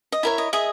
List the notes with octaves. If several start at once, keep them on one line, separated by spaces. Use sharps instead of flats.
D#5
E4 A#4 C#5 E5
D#5
G#4 D#5 E5